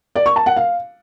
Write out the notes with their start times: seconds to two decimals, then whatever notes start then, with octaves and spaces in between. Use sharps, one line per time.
0.15 D5
0.26 C#6
0.36 A5
0.46 F#5
0.57 F5